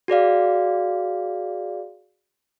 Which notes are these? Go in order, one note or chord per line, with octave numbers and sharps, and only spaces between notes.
F#4 G#4 D5 F5